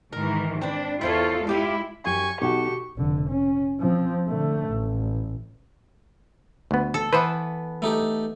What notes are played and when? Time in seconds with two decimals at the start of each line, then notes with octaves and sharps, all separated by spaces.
0.13 G#2 D#3 E3 A#4
0.62 C4 D4 B4
1.01 E2 E4 F4 A4 C5 C#5
1.47 G#3 E4 F4 G4 F5
2.06 F#2 G4 G#5 C#6
2.42 B1 F#4 G4 A4 C#6
2.97 F1 D3
3.30 C#4
3.80 F3 C4
4.29 D3 A3
4.69 A1
6.71 D2 B3
6.94 A4
7.13 E3 B3 B4 C5
7.82 A3 D#4 G4